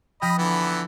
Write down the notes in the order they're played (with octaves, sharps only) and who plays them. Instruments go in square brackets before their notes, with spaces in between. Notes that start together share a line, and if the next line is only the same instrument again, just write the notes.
[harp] F3 G5 F6 [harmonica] D#5 B5
[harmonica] D3 E3 B3